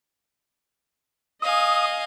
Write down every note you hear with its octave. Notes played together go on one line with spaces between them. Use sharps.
D#5 F5 G#5 D#6